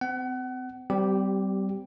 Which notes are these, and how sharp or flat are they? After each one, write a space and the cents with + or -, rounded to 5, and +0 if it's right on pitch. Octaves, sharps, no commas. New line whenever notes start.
C4 -35 F#5 +30
G3 -20 C4 -35 G4 +0